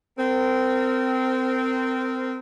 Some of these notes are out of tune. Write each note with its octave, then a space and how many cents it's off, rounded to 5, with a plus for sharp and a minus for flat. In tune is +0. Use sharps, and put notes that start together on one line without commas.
C4 -20 A#4 -35